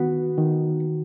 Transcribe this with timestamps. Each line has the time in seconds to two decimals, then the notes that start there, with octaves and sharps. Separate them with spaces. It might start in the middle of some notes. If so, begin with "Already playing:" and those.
Already playing: D#3 B3 F#4
0.37 D#3